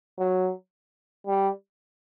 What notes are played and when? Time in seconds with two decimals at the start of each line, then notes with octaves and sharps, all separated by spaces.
0.19 F#3
1.27 G3